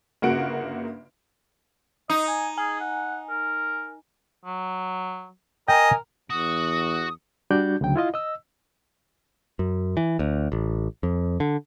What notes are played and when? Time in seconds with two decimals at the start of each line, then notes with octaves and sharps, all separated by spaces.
0.22 G1 C#3 A#3 F#4 F#5 D7
2.10 D#4 D#5 D#6
2.28 G#5
2.58 G#4 G#5
2.80 F#5
3.29 A#4
4.45 F#3
5.68 A#4 D#5 G5 G#5
6.30 E2 F#4 D#6
7.51 G3 D4 F#4 D5 G6
7.81 D2 C#3 F#3 G5
7.96 E4 F4 D#5 F5
8.14 D#5 E6
9.59 F#2
9.97 E3
10.19 D2
10.52 A1
11.03 F2
11.40 D3